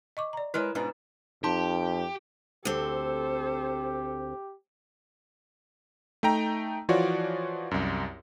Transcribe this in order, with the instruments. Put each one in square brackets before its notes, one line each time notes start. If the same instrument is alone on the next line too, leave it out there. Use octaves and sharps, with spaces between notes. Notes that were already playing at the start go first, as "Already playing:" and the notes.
[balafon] D#5 C#6 D6
D5 A#5
[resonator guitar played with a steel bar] G#3 A#4 B4 [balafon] E4 C#5
[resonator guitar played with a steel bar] G#2 B2 D4 [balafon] B4
[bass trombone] F2 [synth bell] D#4 A5 C6 [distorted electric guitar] G4
[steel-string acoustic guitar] D2 C4 [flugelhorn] G4 [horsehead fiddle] A4 C5
[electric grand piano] A3 D#4 G5 A#5
E3 F3 F4 F#4 C#5 D5
C2 F#2